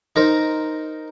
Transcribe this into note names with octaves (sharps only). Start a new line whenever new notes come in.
D#4 A#4 C5